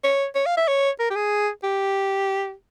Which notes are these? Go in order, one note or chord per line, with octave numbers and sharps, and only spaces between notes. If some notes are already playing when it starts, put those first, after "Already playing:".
C#5
C#5
F5
E5
C#5
A#4
G4
G#4
G4